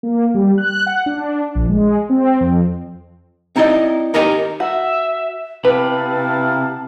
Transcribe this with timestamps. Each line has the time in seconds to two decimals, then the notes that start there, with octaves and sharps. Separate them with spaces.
0.03 A#3
0.34 G3
0.58 F#6
0.86 F#5
1.06 D4
1.55 A#1
1.69 G#3
2.10 C4
2.41 F2
3.56 C4 D#4 E4 D5 D#5
4.14 D#4 G4 A#4 D#5 G#5 A#5
4.60 F#4 E5
5.65 C3 B3 E4 B4 F5 A5